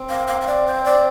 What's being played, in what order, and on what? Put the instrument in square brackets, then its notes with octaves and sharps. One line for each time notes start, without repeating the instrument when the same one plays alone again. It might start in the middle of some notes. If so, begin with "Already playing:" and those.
Already playing: [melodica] C4
[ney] F5
F5
F5
D5
C5
D5